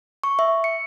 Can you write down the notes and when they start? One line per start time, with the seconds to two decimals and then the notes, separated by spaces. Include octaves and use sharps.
0.24 C#6
0.39 E5
0.64 C#7